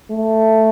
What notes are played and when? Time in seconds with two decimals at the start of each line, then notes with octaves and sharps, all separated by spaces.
0.11 A3